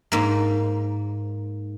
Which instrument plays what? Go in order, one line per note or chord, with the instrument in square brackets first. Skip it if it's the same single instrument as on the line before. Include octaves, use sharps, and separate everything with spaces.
[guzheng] G#2 A#3